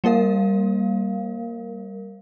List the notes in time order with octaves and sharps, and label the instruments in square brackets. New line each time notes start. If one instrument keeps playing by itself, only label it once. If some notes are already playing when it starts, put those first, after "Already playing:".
[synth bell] G3 A#3 A#4 F5